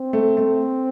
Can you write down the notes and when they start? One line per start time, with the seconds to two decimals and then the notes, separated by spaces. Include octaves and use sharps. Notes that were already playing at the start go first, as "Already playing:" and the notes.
Already playing: C4
0.13 A3
0.37 A3